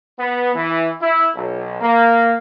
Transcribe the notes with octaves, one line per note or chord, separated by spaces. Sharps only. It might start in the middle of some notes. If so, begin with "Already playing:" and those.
B3
E3
E4
B1
A#3